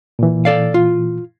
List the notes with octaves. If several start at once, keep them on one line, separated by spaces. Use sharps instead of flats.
A#2 E3
A4 D5 F5
F4